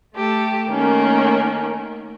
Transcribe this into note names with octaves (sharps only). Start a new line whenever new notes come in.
A3 G4 A4
D#3 A3 A#3 C#4